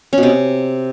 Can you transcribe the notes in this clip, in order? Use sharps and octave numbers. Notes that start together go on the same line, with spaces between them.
C#4
B2
C3